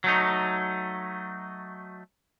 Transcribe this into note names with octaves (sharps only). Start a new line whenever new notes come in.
F#3 A3 D#4